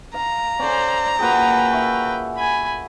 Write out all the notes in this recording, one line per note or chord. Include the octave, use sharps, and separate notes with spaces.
F5 A#5
C#4 A4 C5 D5
A#2 F#4 G#4 B4 G5
E5 C#6
G#5 B5